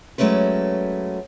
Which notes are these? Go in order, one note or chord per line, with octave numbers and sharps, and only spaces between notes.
F#3 G#3 A3 C#4 B4